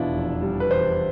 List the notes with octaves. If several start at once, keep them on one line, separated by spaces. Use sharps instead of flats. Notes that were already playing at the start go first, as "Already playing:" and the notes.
Already playing: F1 E2 B2 D4 E4 F4
F1
G3
B4
E2 C5